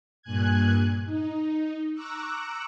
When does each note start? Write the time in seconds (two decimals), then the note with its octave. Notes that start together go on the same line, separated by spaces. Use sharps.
0.22 G2 A#2 G#5 F#6 G#6
1.05 D#4
1.93 A#5 C#6 D6 E6 F#6